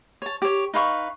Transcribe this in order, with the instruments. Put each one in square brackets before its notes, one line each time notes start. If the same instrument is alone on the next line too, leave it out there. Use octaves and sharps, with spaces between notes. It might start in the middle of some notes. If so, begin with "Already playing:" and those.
[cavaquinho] C#5 A5
G4 C#5
D#4 B4 F5 C#6